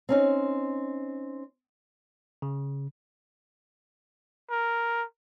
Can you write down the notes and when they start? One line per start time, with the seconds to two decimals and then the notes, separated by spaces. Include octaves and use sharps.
0.09 C4 C#4 D#4
2.42 C#3
4.50 A#4